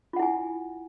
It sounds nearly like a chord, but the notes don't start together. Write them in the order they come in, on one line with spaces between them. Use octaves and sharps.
F4 F#5 E4 G#5